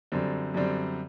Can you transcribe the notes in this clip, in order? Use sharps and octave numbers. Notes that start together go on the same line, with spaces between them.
F#2 D3 G3 C4
F#2 D3 G3 C4